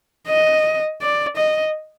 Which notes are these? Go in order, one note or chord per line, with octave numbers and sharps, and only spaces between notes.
D#5
D5
D#5